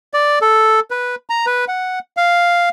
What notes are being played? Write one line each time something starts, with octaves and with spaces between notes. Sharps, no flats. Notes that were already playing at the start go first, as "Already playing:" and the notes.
D5
A4
B4
A#5
B4
F#5
F5